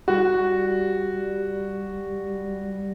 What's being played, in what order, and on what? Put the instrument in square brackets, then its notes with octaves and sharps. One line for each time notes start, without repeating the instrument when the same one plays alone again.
[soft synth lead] G3 [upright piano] F#4